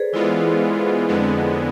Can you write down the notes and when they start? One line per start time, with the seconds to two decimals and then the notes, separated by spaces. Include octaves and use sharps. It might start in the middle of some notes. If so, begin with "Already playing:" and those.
Already playing: G#4 A4 B4 C5 D5
0.13 E3 G#3 B3 E4 F4
1.08 F2 D3 G#3 B3